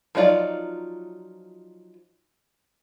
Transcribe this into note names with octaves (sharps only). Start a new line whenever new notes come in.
F3 F#3 D#4 F4 D5